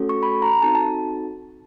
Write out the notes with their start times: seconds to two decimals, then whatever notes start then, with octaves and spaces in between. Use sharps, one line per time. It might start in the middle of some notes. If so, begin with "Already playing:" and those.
Already playing: A3 C#4 F#4 A4
0.09 C#6
0.23 B5
0.42 A#5
0.62 C4 D#4 F#4 A4 A5
0.75 A5